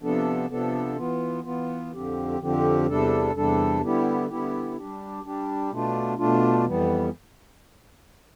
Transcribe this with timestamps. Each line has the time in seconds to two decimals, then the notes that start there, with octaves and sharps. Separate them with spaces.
0.02 C3 F3 B3 D4 A4
0.50 C3 F3 B3 D4 A4
0.97 E3 B3 F4
1.44 E3 B3 F4
1.92 F2 D3 F3 C4 G4
2.39 F2 D3 F3 C4 G4
2.86 E2 C3 G3 D4 A4
3.34 E2 C3 G3 D4 A4
3.81 D3 G3 B3 E4 G4
4.28 D3 G3 B3 E4 G4
4.76 G3 D4 G4
5.24 G3 D4 G4
5.70 B2 A3 D4 F4
6.18 B2 A3 D4 F4
6.66 F2 E3 G3 B3